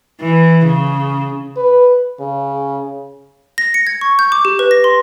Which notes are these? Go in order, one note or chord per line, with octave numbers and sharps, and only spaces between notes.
E3
C#3
B4
C#3
A#6
C#7
G#6
C#6
G6
D6
G4
B4
A#6
C6